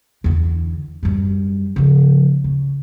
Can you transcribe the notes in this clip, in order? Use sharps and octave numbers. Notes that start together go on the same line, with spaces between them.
E2 D3
F#2 G3
C#3 F3
C#3